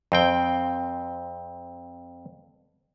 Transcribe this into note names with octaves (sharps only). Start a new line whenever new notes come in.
F2 C4 G5